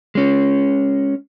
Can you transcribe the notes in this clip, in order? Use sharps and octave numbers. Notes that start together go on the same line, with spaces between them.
G#3 C#4